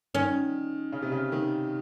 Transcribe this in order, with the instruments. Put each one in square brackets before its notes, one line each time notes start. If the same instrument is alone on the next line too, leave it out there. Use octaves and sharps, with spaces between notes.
[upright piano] D#3 [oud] C#4
[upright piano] C#3
C3
C#3
D#3